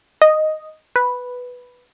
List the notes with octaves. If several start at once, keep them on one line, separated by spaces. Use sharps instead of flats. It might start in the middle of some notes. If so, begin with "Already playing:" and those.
D#5
B4